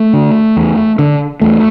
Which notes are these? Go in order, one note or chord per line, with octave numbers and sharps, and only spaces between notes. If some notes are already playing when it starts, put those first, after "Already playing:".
Already playing: A3
D3
E2
D3
E2 A3